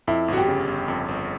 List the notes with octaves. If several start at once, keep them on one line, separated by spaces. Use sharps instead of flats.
F2 E4
G1 F#4
G4
C#3
G1
F2
G1